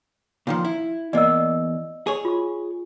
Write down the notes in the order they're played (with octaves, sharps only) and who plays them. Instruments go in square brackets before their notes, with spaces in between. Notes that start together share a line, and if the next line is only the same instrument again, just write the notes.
[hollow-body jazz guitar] A#2 D#3 F3
E4
[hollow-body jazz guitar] E2 A#3 [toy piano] D5 D#5 E6
[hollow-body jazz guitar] G#4 C#5
[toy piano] F4 C#6